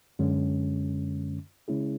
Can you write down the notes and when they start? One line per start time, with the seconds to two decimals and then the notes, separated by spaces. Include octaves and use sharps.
0.19 F#2 D3 G#3 C#4
1.68 C#3 G#3 C#4 E4 G#4